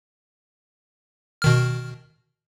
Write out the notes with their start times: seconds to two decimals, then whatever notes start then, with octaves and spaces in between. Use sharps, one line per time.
1.42 B2 D#3 F6